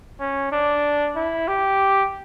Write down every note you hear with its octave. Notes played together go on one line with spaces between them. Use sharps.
C#4
D4
E4
G4